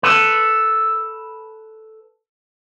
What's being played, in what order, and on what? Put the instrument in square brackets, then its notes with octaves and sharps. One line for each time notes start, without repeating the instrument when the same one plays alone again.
[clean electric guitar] A4 B4